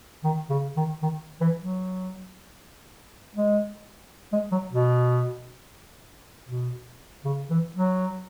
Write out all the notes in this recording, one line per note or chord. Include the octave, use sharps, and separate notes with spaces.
D#3
C#3
D#3
D#3
E3
F#3
G#3
G#3
F#3
B2
B2
C#3
E3
F#3